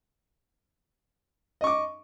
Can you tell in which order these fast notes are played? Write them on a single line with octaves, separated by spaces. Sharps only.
D#5 C#6 D6